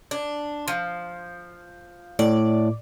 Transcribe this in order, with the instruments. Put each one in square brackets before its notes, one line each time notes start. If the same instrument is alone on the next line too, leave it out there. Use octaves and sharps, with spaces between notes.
[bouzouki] D4
F3
[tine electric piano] A2 [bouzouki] D5